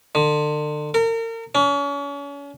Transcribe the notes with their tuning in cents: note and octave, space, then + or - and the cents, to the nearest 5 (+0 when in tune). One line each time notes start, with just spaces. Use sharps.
D3 +35
A#4 -35
C#4 +35